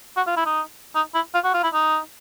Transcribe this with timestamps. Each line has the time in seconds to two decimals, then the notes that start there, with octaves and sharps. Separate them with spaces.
0.17 F#4
0.27 F4
0.37 E4
0.46 D#4
0.96 D#4
1.15 E4
1.34 F4
1.44 F#4
1.54 F4
1.64 E4
1.74 D#4